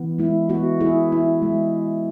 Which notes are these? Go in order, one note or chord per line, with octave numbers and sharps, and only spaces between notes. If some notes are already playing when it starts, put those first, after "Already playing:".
Already playing: E3 B3
G#3 E4
B3 F#4
E4 G#4
E4
G#3